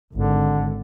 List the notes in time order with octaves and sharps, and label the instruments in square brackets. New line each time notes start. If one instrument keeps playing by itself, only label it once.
[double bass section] G#1 [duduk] D3